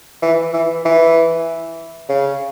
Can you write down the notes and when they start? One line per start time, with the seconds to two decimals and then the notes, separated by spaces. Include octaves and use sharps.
0.22 E3
0.53 E3
0.85 E3
2.09 C#3